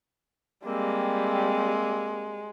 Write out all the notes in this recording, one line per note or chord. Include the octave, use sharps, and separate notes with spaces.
G3 G#3 A#3 C4